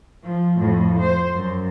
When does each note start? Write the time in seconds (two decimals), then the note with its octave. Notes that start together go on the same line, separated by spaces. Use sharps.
0.23 F3
0.58 F2 A2
1.00 C5
1.35 F#2